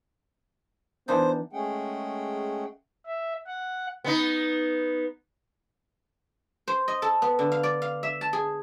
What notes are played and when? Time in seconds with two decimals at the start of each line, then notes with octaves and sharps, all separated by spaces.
1.08 E3 B3 D4 D#4 C5
1.53 G#3 A3 C#4 G#4 F#5 G5
3.06 E5
3.47 F#5
4.04 B3 D#4
6.68 C5
6.88 D#5
7.02 A4
7.22 B3
7.39 D3
7.52 F5
7.63 D5
7.82 F5
8.03 E5
8.21 A5
8.33 G#4